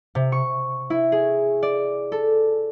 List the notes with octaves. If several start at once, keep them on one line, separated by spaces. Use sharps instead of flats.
C3
C#6
E4
G#4
D5
A4